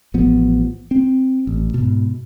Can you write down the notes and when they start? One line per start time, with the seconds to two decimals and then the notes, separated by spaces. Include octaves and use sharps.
0.14 A1 F3 B3
0.91 C4
1.47 A1
1.74 G#2 B2